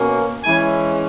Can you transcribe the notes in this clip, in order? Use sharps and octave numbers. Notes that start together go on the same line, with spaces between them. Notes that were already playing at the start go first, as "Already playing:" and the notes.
Already playing: B2 A#3 C#4
E3 G#3 C#4 E4 G#5